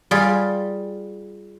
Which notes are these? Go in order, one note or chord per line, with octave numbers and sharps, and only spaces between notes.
G3 F4 G#4